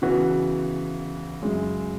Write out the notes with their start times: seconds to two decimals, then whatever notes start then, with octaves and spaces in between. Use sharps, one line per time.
0.02 C#3 E3 B3 F#4
1.42 F#2 C#3 G#3